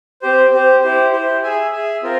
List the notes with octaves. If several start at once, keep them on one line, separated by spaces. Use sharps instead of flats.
C4 G4 C5
C4 G4 C5
E4 G4 C5
E4 G4 C5
G#4 E5 G#5
G#4 E5 G#5
C4 F4 A#4